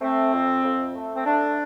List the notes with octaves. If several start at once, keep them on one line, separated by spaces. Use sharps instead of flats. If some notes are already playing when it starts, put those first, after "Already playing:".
A3 C4
F2
F2
A3
C4
A3 D4